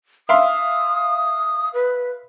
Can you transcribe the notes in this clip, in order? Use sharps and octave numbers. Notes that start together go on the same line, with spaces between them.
E5 F5 C6 D#6
B4